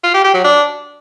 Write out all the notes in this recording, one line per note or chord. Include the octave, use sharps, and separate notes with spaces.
F4
G4
G4
F#3
D4